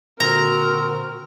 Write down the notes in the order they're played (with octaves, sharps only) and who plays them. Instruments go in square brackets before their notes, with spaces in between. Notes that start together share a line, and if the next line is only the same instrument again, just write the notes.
[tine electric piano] A#2 D3 F6 [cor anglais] C4 [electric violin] F#4 A#4 [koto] A#5